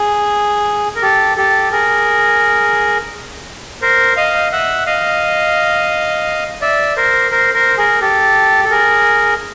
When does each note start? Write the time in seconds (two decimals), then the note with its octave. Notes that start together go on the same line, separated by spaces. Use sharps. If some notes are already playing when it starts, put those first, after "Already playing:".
Already playing: G#4
0.95 A#4
1.02 G4 A4
1.37 G4 A4
1.72 G#4 A#4
3.82 A#4 C5
4.16 D#5 F5
4.52 E5 F#5
4.86 D#5 F5
6.61 D5 E5
6.96 A#4 C5
7.31 A#4 C5
7.54 A#4 C5
7.78 G#4 A#4
8.01 G4 A4
8.64 A4
8.71 G#4 A#4